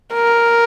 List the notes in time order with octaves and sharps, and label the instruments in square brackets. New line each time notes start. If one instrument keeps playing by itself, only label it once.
[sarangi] A#4